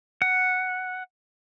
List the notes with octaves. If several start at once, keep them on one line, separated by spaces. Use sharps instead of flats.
F#5